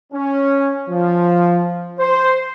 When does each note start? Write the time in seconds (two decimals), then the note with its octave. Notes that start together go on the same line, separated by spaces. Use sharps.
0.13 C#4
0.89 F3
1.99 C5